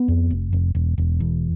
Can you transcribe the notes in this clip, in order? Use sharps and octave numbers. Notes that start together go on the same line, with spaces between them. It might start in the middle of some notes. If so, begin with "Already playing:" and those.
Already playing: B3
F2
F1
F1
E1
E1
E2